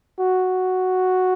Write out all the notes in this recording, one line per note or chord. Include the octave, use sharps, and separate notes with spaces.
F#4